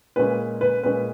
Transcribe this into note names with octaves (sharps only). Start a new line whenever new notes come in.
A#2 G#3 C#4 B4
B4
A#2 G#3 C#4 B4